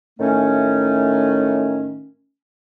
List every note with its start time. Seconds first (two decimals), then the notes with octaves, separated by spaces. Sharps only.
0.19 A2 D#3 A3 C#4